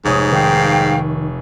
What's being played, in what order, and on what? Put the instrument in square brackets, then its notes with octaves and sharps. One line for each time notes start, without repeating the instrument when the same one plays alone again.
[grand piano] F1 C#5 D#6 [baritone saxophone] G#2
[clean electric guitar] D#3 [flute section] F5 G5